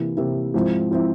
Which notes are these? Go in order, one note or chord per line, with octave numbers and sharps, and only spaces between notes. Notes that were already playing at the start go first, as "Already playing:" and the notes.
Already playing: C3 E3 A#3 E4
C3 E3 A#3 E4
G#2 F3 C4 E4
F3 C4 E4